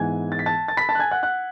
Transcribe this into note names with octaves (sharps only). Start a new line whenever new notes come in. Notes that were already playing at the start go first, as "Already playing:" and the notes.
Already playing: G#2 E3 B3 G#5 G#6
A6
B6
A5 A6
A6
B5 B6
A5 A6
F#6
G#5 G#6
F#5 F#6
F#5 F#6